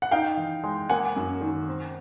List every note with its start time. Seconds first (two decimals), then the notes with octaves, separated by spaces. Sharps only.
0.02 F#5
0.11 D#4 F5 G5
0.37 E3
0.64 G#3
0.89 A#3 F#5 G#5
1.16 F#2
1.41 D#3
1.68 C4